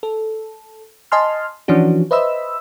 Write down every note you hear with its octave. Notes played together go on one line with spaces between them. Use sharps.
A4
D#5 G#5 A5 C6 F6
E3 F3 C#4 D4 F#4
B4 C5 D#5 E5 B5 E6